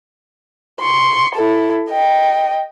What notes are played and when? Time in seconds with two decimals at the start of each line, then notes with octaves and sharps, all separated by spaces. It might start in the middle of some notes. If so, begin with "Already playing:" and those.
0.80 C6 C#6
1.35 E4 A4
1.90 D#5 G5